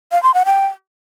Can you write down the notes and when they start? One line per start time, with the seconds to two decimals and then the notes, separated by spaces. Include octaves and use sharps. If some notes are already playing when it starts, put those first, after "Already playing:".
0.12 F5
0.23 C6
0.34 F#5
0.45 G5